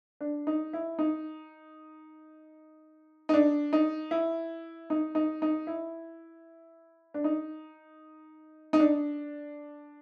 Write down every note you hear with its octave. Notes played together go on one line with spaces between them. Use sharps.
D4
D#4
E4
D#4
D#4
D4
D#4
E4
D#4
D#4
D#4
E4
D4
D#4
D#4
D4